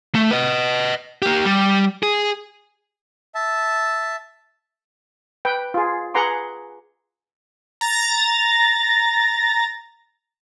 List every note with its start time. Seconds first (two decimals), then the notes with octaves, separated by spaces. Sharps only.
0.15 A3
0.31 B4 D#5
1.22 A#3 G4
1.45 G3
2.03 G#4
3.35 E5 A5
5.45 B4 G5
5.74 F4 G#4
6.14 G#4 B4 F#5 A#5 C6 D6
7.81 A#5 A6 A#6